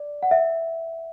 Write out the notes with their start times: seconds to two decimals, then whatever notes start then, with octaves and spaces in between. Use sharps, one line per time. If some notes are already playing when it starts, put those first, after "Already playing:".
Already playing: D5
0.23 F#5
0.31 E5